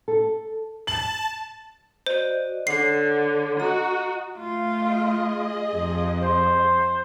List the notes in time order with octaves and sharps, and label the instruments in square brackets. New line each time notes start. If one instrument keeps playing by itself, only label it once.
[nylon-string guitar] A4
[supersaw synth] A5 [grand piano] F#7
[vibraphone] F#4 D5 D#5 [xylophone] C5
[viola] D3 [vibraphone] C#5 F#5 [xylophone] C7
[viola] F#4 [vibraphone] D#5 A#5 D#6
[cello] A3 F4
[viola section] G#4 D#5
[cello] F2
[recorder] C5